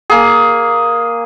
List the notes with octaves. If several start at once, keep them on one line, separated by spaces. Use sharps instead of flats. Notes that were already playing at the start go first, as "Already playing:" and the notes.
A#3 G#4